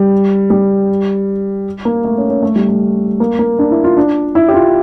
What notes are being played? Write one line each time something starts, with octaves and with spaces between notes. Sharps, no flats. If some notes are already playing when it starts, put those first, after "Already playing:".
Already playing: G3
G3
A#3
A3
C#4
C#4
A3
G3
A3
A#3
A#3
D4
E4
F4
D4
E4
G4
F4